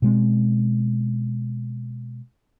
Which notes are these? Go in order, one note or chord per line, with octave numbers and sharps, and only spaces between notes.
B2 G#3 C4